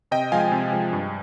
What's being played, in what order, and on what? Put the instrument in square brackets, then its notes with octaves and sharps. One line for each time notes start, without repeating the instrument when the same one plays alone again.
[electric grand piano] C3 D#5 G5
F3 G#3 F5 G#5
C3
F3 G#3
G2